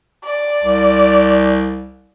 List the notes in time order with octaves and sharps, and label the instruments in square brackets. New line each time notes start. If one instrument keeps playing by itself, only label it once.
[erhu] D5
[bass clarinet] C2